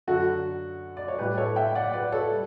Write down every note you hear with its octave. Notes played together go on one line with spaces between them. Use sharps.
F#2 D3 F#3 F#4 A4
D5
C#5
A2 G3 G4 B4
A4 C#5
E5 G5
D5 F#5
B4 D5
A4 C#5
G3